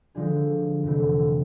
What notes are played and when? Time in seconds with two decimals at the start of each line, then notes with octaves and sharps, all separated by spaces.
0.15 D3 F3 G#3 D4 G#4
0.84 F2 C3 E3 A3